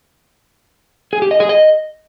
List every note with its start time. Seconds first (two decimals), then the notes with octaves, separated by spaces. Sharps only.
1.13 G#4
1.22 G4
1.31 D#5
1.40 G#4
1.49 D#5